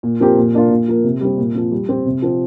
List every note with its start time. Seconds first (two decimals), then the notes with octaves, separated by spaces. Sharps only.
0.03 A#2
0.20 F3 C4 G4 A#4
0.38 A#2
0.54 A#3 D4 F4
0.71 A#2
0.88 F3 A#3
1.04 C3
1.21 G3 C4
1.38 A#2
1.55 F3 C4
1.71 G3
1.89 C4 G4 C5
2.06 C3
2.22 F3 C4